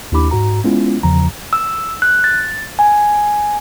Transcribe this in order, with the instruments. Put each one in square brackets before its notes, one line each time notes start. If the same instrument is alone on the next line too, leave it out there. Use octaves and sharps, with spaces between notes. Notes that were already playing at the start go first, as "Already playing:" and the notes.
[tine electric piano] D#2 D4 E4 G4 B5 D6
G#2 F#4 A#5
G#3 B3 C#4 E4 F4
E2 C#3 F3 A#5
[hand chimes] E6
F#6
A6
G#5